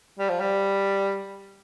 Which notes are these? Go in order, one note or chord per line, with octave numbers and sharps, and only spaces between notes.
G3
F3
G3